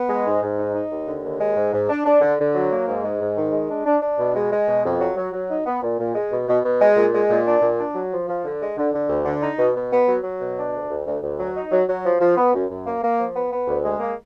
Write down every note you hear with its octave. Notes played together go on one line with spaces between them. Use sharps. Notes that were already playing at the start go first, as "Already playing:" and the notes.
Already playing: B3
G#3
G#2
G#2
D#4
D#4
D#2
D3
D#2
G#3
G#2
G#2
D4
D4
D3
D3
F#3
A#3
G#2
G#3
G#2
D#3
G#3
D4
D4
D4
B2
G#3
G#3
B2
F2
F#3
F#3
F#3
D#4
B3
A#2
A#2
G#3
B2
B2
B2
G#3
A#2
G#3
A#2
D4
A#2
D4
F#3
F3
F3
D3
G#3
D3
D3
D2
D3
D#4
B2
B2
B3
F#3
F#3
B2
D4
D2
D2
D2
D2
F#3
D#4
F#3
F#3
F3
F3
B3
F#2
F#2
A#3
A#3
F3
B3
B3
D2
G#3
A#3